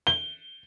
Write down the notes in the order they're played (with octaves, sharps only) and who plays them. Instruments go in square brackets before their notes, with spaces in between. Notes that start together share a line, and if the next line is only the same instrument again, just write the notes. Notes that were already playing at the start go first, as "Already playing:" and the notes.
[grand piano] G7